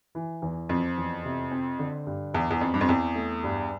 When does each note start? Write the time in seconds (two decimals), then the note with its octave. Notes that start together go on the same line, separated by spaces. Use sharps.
0.15 E3
0.42 E2
0.69 F2 F3
0.98 E2
1.25 C3
1.51 C4
1.79 D3
2.07 G2
2.34 E2 E3
2.51 E2
2.61 F2 C4
2.74 G2
2.81 F2
2.89 E2 C4
3.15 A3
3.43 G2